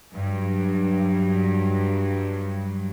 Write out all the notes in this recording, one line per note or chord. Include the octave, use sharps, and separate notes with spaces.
G2 F#3